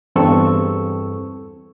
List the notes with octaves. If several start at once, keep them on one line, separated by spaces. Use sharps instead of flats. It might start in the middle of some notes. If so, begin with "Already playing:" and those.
E2 G2 C4 A4 C#6 E6